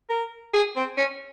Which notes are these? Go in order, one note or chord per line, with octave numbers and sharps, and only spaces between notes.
A#4
G#4
C4
C#4